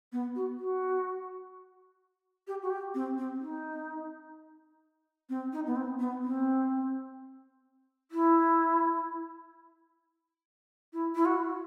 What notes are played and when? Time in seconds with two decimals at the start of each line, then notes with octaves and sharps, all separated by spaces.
0.12 B3
0.35 F#4
0.58 F#4
2.48 G4
2.63 F#4
2.70 G4
2.95 C4
3.18 C4
3.41 D#4
5.29 C4
5.53 D#4
5.67 B3
5.76 C4
5.99 B3
6.23 C4
8.11 E4
10.93 E4
11.15 E4
11.26 F#4